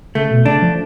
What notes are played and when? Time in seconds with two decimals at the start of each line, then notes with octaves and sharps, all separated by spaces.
0.15 C#3 A3
0.30 B2
0.45 C#3 D4
0.62 F3